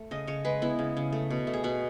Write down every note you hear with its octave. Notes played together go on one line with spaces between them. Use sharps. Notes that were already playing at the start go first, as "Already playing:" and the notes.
Already playing: A3
C#3 D#5
C#3 C#5
G#3 B4
B3 E4
C#3
C#3
A3
B2
A3
G#4
B2 F#4